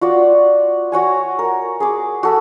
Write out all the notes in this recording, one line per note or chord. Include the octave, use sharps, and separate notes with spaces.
F4 F#4 D5
F#4 C#5 F#5 G#5
A#4
G#4 B5 D6
F#4 A4 B5